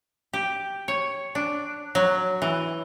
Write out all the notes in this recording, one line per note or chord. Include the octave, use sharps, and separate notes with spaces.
G4
C#5
D4
F#3
E3